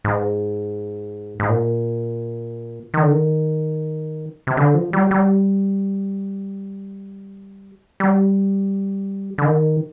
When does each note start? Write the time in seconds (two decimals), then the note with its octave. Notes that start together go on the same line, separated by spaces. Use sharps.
0.04 G#2
1.40 G#2
1.49 A#2
2.94 D#3
3.02 D3
3.12 D#3
4.47 C3
4.57 D3
4.74 F3
4.93 G3
5.11 G3
8.00 G3
9.38 D3
9.45 D#3